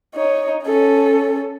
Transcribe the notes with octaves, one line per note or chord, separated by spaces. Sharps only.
D#4 C#5
C#4 A4